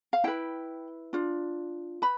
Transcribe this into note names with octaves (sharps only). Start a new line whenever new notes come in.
F5
E4 B4 G5
D4 F4
B4 B5